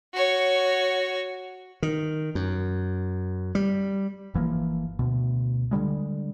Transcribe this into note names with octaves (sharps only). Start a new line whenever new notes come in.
F#4 C#5
D#3
F#2
G3
G1 E3 F3 A#3
D2 B2
D3 D#3 G3 G#3